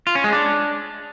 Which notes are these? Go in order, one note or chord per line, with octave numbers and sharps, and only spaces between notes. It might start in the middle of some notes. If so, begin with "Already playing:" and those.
F4
C#4
G#3
D4